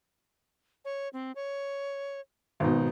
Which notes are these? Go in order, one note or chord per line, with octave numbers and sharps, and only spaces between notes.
C#5
C4
C#5
G#1 B2 D#4